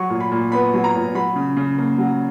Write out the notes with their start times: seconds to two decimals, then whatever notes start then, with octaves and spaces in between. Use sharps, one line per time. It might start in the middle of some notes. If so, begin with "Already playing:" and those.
Already playing: F#3 C#6
0.10 A#2
0.20 B5
0.32 A#2
0.52 B3 B5
0.74 F#3
0.84 A#5
0.95 A#2
1.15 F#3 B5
1.36 C#3
1.56 C#3
1.78 A#3
1.98 F#3